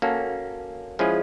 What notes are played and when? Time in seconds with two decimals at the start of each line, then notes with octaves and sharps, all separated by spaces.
0.02 A#3 C#4 F#4 A4
0.99 F3 G#3 C#4 E4 G#4